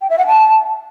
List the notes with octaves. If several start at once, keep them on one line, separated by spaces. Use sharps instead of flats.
G5
E5
F#5
A5